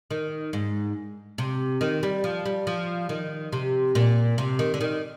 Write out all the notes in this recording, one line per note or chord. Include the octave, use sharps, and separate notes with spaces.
D#3
G#2
C3
D#3
G3
F3
G3
F3
D#3
C3
A#2
C3
D#3
D3
D#3